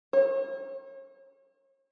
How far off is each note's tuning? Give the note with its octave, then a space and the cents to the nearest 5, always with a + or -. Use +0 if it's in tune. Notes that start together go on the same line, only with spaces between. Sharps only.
C#5 -40